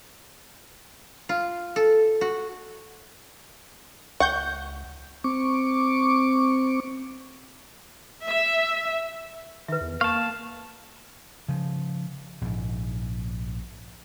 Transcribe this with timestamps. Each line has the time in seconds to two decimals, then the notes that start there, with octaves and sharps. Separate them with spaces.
1.29 F4
1.76 A4
2.21 F#4
4.20 C#2 F#5 C#6 G6
5.24 C4 C#6 D6
8.25 E5
9.68 D#3 B4 E5
9.81 E2
10.01 A#3 F5 A5 C#6
10.15 A#3
11.48 C#3 F3
12.41 A#1 G#2